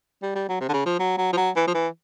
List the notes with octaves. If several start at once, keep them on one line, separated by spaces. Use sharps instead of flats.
G3
G3
F#3
C3
D3
C#3
F3
F#3
F#3
F3
F#3
E3
F3
E3